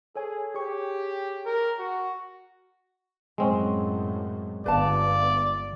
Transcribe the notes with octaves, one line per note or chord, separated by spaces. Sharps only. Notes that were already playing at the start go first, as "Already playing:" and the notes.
G#4 A4 C#5 G#5
G4 G#4 C#5 C#6
A#4
F#4
F#2 A2 G#3 C4 C#4
G1 B4 D5 F5 A5